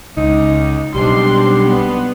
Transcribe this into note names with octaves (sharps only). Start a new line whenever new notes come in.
C#2 D#4
B1 G3 C4 D4 C6
B3